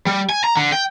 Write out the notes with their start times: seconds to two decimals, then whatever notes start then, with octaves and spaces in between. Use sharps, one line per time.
0.07 G3
0.29 G#5
0.44 A#5
0.57 D3
0.72 G5